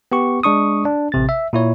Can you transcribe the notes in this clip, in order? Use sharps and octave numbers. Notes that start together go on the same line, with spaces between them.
B3 G4 C#6
G#3 D4 C#6 D#6
D4
A1 C3 A6
E5
A#2 E4 C#5